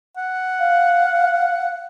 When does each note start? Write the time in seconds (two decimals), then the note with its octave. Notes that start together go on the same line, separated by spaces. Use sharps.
0.17 F#5
0.60 F5